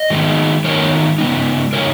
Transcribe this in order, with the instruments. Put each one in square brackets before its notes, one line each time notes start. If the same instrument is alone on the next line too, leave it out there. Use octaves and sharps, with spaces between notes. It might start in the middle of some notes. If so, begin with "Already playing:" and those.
Already playing: [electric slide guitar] D#5
D#3 G#3 B3 D#4
D#3 G#3 B3 D#4 A#4 C#5
C#3 G#3 B3 D#4
C#3 G#3 B3 D#4 A#4 C#5